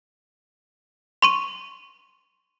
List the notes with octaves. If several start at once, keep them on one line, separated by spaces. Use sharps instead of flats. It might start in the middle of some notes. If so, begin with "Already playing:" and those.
C6 C#6 D#7